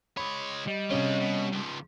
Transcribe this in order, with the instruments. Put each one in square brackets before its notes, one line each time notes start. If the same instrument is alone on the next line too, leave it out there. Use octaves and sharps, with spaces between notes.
[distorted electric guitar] G#3 C#5 [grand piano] B5
[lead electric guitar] G3 [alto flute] D#5
[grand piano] C3 C#4 [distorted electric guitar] G#3 F4
[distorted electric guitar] B2
C#2 F3